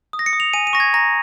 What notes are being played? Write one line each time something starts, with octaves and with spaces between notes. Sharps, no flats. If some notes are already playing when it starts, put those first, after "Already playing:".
D#6
A#6
C#7
D#6
F7
G#5 D#7
D#7
C#6 A#6
G#6
A#5 A#6